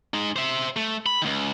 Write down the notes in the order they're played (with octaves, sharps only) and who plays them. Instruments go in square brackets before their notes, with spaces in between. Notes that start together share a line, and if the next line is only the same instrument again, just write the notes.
[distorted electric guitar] G#3 D#4
C5 E5
A3
B5
C#2 D#3